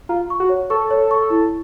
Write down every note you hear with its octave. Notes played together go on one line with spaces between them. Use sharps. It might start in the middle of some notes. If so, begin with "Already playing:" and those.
F4 A#5
C#6
F#4
C#5
A4 C#6
C#5
C#6
E4